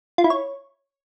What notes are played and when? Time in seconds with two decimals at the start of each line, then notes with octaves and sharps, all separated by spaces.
0.18 F4
0.24 E4
0.30 C#5